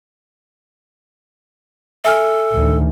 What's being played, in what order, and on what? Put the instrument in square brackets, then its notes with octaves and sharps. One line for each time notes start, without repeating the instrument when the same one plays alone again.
[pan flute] A4 [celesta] E5 G#5 F6
[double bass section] A1 D2 D#3